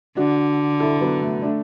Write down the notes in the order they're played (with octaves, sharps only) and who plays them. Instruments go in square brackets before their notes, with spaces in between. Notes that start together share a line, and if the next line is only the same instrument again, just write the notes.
[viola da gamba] D3 [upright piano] D4 F#4
[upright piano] E4 A4
F#3 B3
A3
A3 D4